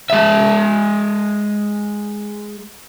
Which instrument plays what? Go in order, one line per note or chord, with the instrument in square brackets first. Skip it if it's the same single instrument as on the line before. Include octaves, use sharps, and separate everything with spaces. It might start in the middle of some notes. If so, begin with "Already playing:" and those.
[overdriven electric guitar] G#3 E5